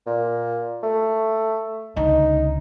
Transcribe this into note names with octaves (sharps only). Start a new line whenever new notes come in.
A#2
A3
C#2 D3 D#4